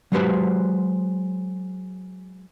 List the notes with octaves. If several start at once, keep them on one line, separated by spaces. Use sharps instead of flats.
F#3 G#3 F#4 G4 B4 C5